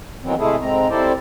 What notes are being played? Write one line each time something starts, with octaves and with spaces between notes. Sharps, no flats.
D#3 E3 F#3 B3 C4
C3 G#3 A3 E4 G#4 A4
G#2 G#3 C4 A#5
G3 C4 E4 A4 C5 D5